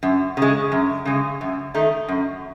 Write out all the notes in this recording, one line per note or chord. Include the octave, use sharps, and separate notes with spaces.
F#2
C#3 G#3
F#2
C#3 G#3
F#2
D#3 A3 D#4
F#2